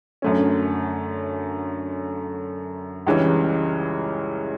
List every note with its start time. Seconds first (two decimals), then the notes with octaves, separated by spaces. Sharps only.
0.22 F#2 D3 A3 C#4
3.06 C#2 C#3 E3 G3 C#4